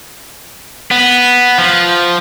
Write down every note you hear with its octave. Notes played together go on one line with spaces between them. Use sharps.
B3
F3